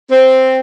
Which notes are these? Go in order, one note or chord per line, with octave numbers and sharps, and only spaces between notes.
C4